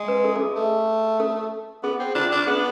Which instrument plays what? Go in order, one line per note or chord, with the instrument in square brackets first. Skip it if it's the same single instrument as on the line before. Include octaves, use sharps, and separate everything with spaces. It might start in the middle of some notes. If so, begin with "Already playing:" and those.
Already playing: [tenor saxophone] G#3
[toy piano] B4
A4
A4
G#4
[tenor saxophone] A3
[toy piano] A4
[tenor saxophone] B3 [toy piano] G#4
[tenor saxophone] C4
[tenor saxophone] D4 [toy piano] F4
[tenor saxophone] D4
[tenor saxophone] B3 [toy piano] G#4